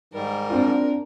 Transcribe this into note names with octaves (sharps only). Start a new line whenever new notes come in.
G#2 D#3 G3 A#4
C4 D4 F4